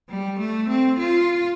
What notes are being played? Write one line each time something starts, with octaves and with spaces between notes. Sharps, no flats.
G3
A3
C4
F4